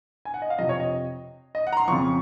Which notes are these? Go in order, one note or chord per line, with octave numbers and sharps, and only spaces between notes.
G#5
F#5
D#5
F5
F2 C3 F3 D#5
C#5
D#5
D#5
F#5
A#5
C6
F2 C#3 F3 C#6